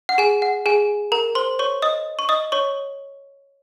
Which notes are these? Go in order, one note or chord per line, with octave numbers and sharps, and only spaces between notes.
F#5
G#4 G#5
F#5
G#4 G#5
A#4 A#5
C5 C6
C#5 C#6
D#5 D#6
C#6
D#5 D#6
C#5 C#6